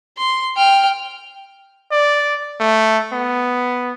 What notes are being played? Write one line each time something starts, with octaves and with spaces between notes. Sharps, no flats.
C6
G5 F6
D5
A3
B3